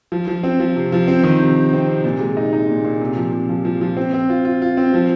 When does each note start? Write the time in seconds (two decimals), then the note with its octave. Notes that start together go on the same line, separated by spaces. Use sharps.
0.12 F3
0.27 F3
0.43 C4
0.60 F3
0.76 C3
0.92 F3
1.08 C4
1.24 D#3
1.40 C3
1.56 C3
1.73 C4
1.88 C3
2.04 A#2
2.20 G#3
2.37 D#4
2.53 D#4
2.69 A#2
2.85 A#2
3.01 C3
3.16 F3
3.33 C3
3.49 F3
3.65 F3
3.81 F3
3.97 C4
4.13 C4
4.30 F4
4.45 F4
4.62 F4
4.77 C4
4.94 F3